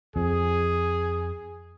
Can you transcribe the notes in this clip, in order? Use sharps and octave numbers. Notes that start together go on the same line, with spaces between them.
F2 G#4